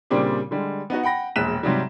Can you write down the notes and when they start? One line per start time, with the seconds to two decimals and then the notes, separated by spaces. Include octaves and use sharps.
0.10 A#2 C#3 G3 C4 D4 G4
0.51 D3 G3 G#3
0.90 B3 D#4 F#4
1.03 F#5 G5 B5 A#6
1.36 E1 A#1 F#6 B6 E7
1.63 G#2 C3 F#3 G3